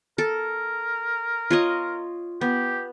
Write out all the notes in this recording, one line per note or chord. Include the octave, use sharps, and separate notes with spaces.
A4 A#4
F4 C#5 D#5
B3 G4